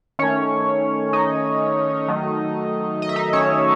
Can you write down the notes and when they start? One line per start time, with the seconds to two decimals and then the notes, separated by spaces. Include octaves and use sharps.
0.19 D#3 A3 C#4 C#5
1.13 D#4 D#5
2.08 D#3 F#3 A3
3.02 D#5
3.09 E5
3.16 D#4 D#5
3.33 C#4 C#5